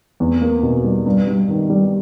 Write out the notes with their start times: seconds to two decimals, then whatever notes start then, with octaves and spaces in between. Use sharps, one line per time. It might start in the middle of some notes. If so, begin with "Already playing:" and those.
0.20 E2
0.41 A#3
0.63 B2
0.84 G3
1.06 G2
1.28 G2
1.49 D#3
1.70 G3